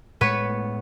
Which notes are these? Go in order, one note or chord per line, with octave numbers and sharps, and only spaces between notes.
A2 G#3 A3 B3 B4 C#5